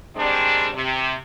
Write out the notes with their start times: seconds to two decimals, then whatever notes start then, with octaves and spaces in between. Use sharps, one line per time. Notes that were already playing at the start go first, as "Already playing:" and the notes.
0.16 D#3 G3 G#3 C4 D4
0.74 C3